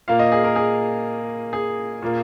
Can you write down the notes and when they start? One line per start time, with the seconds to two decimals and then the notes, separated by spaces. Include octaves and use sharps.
0.08 A#2 A#3 F5
0.19 D#5
0.32 G#4
0.44 A#4
0.56 G#4
1.53 G#4
2.02 A#2 A#3